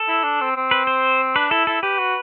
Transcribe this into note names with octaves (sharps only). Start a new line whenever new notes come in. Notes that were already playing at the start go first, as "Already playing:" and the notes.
Already playing: A4
E4
D4
C4
C4
B4
C5
D4 B4
E4 A4
E4 A4
G4 B4
F#4